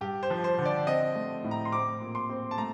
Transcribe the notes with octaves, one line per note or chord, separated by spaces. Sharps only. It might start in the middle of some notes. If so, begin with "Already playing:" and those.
G2 G4
C5
F3
C5
D3
D5
C4 D#5
A3
A2
A#5
C6
C4 D6
A#2
C6
C4
A5
A3 A#5